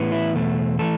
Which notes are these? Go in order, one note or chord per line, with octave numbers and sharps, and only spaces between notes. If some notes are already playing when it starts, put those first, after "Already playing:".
Already playing: A2 E3 B3
E4
E2 B2 A3
E3 A3 A4